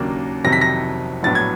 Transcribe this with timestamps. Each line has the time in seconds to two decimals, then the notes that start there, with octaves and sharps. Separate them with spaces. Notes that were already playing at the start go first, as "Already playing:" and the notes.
Already playing: D#2 C#3 F#3 A#3 D4
0.44 F2 C3 D#3 F#3 A#6
0.53 B6
0.61 A#6
1.23 A#1 A2 F#3 B3 D4 A6
1.35 G#6